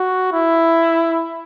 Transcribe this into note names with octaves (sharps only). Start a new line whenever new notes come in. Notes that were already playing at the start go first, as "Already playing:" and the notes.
Already playing: F#4
E4